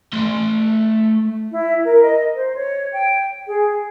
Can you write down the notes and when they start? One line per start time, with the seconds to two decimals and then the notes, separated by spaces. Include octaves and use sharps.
0.13 A3 C6
1.52 E4
1.84 A#4
2.03 D#5
2.35 C5
2.56 C#5
2.92 G5
3.47 G#4